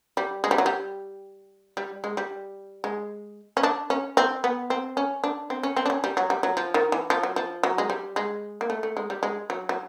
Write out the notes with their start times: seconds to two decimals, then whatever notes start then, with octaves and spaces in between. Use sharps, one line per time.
0.17 G3
0.44 G#3
0.51 G3
0.58 F#3
0.66 G3
1.77 G3
2.04 G#3
2.17 G3
2.84 G#3
3.57 C#4
3.63 D4
3.90 C#4
4.17 C4
4.44 B3
4.70 C4
4.97 C#4
5.24 D4
5.50 C4
5.63 C#4
5.76 C4
5.86 D4
5.90 C#4
6.04 G3
6.17 F#3
6.30 G3
6.43 F#3
6.57 F3
6.74 D#3
6.92 E3
7.10 F3
7.23 F#3
7.36 F3
7.63 F#3
7.78 G#3
7.90 G3
8.16 G#3
8.61 A#3
8.70 A3
8.83 A3
8.97 G#3
9.10 G3
9.23 G#3
9.50 F#3
9.69 F#3